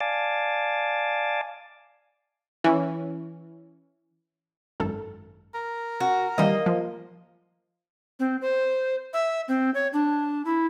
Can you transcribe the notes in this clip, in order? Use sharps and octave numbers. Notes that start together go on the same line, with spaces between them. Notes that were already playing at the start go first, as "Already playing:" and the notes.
D5 F5 G#5 A5 D6
E3 C#4
G#1 F#2 A4
A#4
F#4
D#3 E3 G3 A#3 D#5
F3
C4
C5
E5
C4
C#5
D4
E4